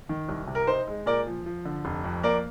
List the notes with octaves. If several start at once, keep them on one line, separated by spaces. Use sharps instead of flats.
D#3
C2
C3
A#4
D#4 C5
G#3
A#2 A#4 D5
F3
F3
D3
F1
F2
A#3 A#4 D5